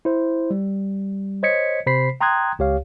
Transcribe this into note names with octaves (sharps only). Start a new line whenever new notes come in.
E4 C5
G3
C5 C#5 D#5 G#6 B6 C#7
C3 C5 B5 B6 C7
G5 A#5 C6 D#6 F#6 G#6
C#2 G4 C#5 F5